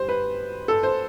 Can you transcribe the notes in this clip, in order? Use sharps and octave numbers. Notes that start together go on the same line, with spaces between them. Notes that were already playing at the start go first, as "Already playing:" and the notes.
Already playing: G3 C5
B4
A4
C5